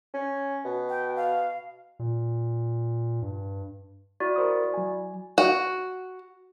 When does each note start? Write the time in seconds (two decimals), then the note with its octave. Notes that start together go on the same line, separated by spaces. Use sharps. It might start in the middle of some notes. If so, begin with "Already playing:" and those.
0.14 C#4
0.65 B2
0.89 G5
1.16 F5
1.99 A#2
3.22 G2
4.20 E4 F#4 D5
4.36 A#4 C5 D#6
4.74 F#3 G#5
5.38 F#4